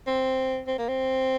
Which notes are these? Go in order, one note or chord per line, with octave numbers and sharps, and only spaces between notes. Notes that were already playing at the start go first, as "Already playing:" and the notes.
C4
C4
A#3
C4